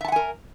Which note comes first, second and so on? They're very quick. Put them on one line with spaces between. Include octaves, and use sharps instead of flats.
E5 A5 F#5 G#5 A#4